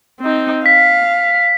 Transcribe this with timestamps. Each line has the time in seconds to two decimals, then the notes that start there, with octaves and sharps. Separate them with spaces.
0.20 C4 D#4
0.66 F5 B6